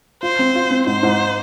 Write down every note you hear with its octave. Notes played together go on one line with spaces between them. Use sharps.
F4 C5
C4
F4
C4
G#2 C5
G#2